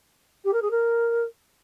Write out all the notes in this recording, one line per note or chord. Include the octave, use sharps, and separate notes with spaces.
G4
A#4
G#4
A#4